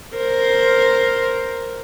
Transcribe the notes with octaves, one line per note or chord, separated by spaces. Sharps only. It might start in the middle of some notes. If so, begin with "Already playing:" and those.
A#4 C5